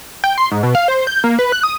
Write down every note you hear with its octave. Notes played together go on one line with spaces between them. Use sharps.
G5
C6
G#2
B2
F5
C5
G6
A#3
B4
F#6
D#6